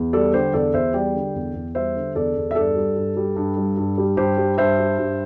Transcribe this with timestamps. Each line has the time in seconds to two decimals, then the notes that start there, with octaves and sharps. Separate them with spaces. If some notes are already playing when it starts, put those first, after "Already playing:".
Already playing: E2
0.13 G3 A4 D5
0.33 D3 G4 C5
0.53 E2 A4 D5
0.74 E2 C5 E5
0.94 G3 D5 G5
1.14 D3
1.35 E2
1.54 E2
1.75 G3 C5 E5
1.95 D3
2.15 E2 A4 D5
2.36 E2
2.51 E5
2.55 G2 A4 D5
2.76 G3
2.96 G2
3.17 G3
3.36 G2
3.57 G3
3.77 G2
3.98 G3
4.17 G2 G4 C5
4.37 G3
4.58 G2 C5 E5
4.78 G3
4.98 G2